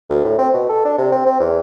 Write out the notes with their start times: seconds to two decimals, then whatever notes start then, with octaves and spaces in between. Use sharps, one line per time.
0.10 D2
0.24 A2
0.38 C4
0.53 B2
0.69 A4
0.85 D4
0.98 C3
1.12 C4
1.26 C4
1.40 E2